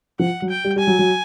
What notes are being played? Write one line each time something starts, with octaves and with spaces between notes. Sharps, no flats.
F3 F#5
F#3
G5
G3
G3 G#5
F#3
F#3